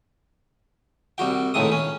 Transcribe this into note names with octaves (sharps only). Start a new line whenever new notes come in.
C2 G3 F#4 G5
C#2 A2 D#3 G#3 D#6
C#4